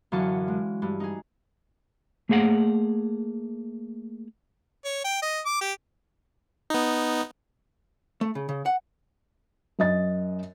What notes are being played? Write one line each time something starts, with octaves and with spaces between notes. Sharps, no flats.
F#2 D3 E3 F5 A5 C#6
G#3
G2
D#4 G#4
A3 A#3 G#4 F5 F#5
C#5
G5
D#5
D6
G4
B3 D#4
A3
C#3
C#3
F#5
F#2 D#5 A6